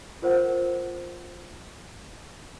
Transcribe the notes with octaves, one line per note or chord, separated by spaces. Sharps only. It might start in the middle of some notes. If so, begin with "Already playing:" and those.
F4 A#4 C5 F#5